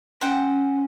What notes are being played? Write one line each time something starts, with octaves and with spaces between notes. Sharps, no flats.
C#4 C5 F#5 G5